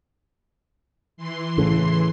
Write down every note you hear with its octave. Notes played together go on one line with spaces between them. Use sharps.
E3 C6
A2 C#3